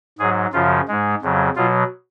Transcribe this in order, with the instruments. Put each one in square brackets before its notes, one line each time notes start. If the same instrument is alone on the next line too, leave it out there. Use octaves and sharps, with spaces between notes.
[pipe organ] G#2 F#3 G#4
F#2 C#3 F3 F4
G#2 G#3
F2 C#3 F#3
B2 F#3 F4